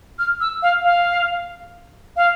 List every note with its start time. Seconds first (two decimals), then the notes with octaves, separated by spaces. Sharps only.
0.19 F6
0.41 E6
0.63 F5
0.85 F5
2.16 F5